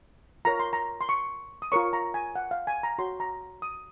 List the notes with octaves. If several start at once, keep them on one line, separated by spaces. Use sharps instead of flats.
F4 A#4 C#5 A#5
C6
A#5
C6
C#6
D#6
F4 A#4 C#5 C#6
A#5
G#5
F#5
F5
G#5
A#5
F#4 C#5 C6
A#5
D#6